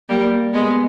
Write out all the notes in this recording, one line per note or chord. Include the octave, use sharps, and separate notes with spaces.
G3 A#3
G#3 B3